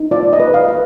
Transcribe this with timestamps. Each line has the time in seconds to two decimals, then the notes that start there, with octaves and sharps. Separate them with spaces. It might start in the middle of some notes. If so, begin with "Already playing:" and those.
Already playing: D#4
0.11 F4 D5
0.33 D#5
0.40 B4
0.54 F5
0.68 B4